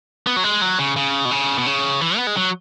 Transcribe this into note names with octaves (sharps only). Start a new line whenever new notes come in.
B3
F#3
G#3
F#3
C#3
C#3
B2
C#3
B2
C#3
E3
B3
G#3
F#3